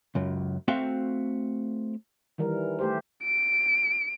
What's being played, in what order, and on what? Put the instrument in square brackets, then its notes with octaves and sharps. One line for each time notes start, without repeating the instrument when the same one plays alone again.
[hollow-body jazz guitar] C#2 F#2
A3 C4 F#4 E5 F5 G5
[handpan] D#3 E3 G3 A#4
A3 G4 C5
[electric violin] D7